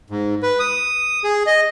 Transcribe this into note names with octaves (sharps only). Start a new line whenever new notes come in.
G#2
B4
D#6
G#4
D#5